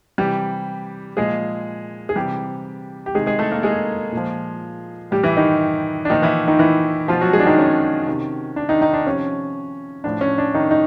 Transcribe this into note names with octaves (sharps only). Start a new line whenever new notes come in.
C3 E3 G3 G4
A#2 F3 G#3 G#4
G#4
C3 E3 G3 G4
G4
C3 D#3 G#3 G#4
G#3 G#4
A3 A4
A#3 A#4
G#3 G#4
A#2 F3
A2 E3 G3 G4
E3 E4
D#3 D#4
D4
A#2 D#3 F3 D#4
E3 E4
D#3 D#4
E3 E4
B2 F3 F4
F#3 F#4
G#3 G#4
D4
D#3 D#4
C#4
C3 D#3
D4
D#3 D#4
D#3 D#4
D4
C3 F3 C#4
A2 F3 D4
C#4
D4
D#3 D#4
D#4